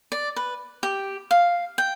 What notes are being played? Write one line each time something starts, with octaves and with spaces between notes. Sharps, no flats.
D5
B4
G4
F5
G5